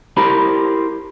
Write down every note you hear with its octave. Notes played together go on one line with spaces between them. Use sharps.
E4 G4 A#4 C5 A#5 B5